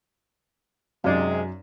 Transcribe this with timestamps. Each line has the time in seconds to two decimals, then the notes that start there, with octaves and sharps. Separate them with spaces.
1.04 F#2 C3 G#3 D#4 D5 F5